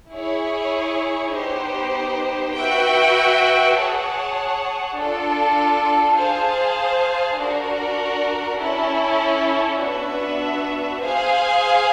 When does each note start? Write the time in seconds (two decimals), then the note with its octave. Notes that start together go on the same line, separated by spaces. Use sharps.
0.12 E4 G#4 C#5
1.34 B3 D#4 G4 C5
2.55 F#4 B4 E5 G5
3.76 G#4 C#5 F#5 A5
4.96 D4 F4 A4
6.17 G#4 C5 F5 A5
7.39 D4 F#4 A#4 D5
8.60 C#4 E4 A4
9.81 B3 D4 F#4 B4 E5
11.02 G#4 C5 F5 G#5